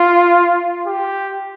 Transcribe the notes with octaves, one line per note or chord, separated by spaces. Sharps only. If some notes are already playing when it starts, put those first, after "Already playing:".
Already playing: F4
G4